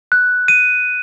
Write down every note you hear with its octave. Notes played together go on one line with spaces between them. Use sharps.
F#6
D#7